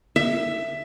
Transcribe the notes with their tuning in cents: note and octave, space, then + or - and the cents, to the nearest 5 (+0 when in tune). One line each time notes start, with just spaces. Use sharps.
E5 +10